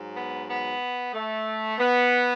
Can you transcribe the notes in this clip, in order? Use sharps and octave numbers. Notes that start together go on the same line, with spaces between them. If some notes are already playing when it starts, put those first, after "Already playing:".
Already playing: G#2 F#3
B3
B3
A3
B3